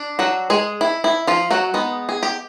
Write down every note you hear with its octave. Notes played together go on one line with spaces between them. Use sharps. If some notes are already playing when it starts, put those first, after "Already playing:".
Already playing: D4
F#3 F#4
G#3 G#4
E4
E4
F3 F4
F#3 F#4
G#3 B3 D#4
G#4
G4